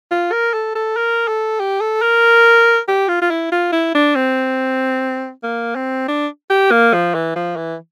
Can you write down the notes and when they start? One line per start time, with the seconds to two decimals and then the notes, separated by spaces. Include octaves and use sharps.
0.11 F4
0.32 A#4
0.53 A4
0.75 A4
0.96 A#4
1.28 A4
1.60 G4
1.81 A4
2.02 A#4
2.88 G4
3.08 F4
3.21 F4
3.30 E4
3.52 F4
3.72 E4
3.95 D4
4.15 C4
5.43 A#3
5.75 C4
6.08 D4
6.50 G4
6.71 A#3
6.93 F3
7.14 E3
7.36 F3
7.56 E3